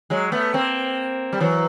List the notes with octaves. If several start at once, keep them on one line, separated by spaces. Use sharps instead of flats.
F#3 G#3
A3 B3
A#3 C4
G3
E3 F#3